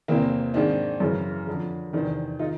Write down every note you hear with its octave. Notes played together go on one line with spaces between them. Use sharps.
E2 C3 E3 A#3 C4
G#2 D#3 C4 D4
F#2 C#3 E3
F2 D3
E2 C3 D#3 C4 D4
D#3 D#4 F4